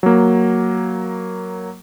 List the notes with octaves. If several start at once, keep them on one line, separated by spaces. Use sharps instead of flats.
F#3 A#3